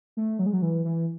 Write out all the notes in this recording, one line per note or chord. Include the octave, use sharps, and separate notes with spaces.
A3
F#3
G#3
F#3
E3
E3